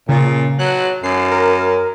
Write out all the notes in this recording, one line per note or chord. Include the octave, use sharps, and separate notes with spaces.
A#2 C#3
F#3 F#6
F#2 C7
A#4